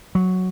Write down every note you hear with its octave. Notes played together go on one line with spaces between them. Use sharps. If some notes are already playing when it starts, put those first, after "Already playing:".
F#3